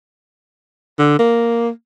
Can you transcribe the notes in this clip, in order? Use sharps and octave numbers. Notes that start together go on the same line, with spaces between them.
D3
A#3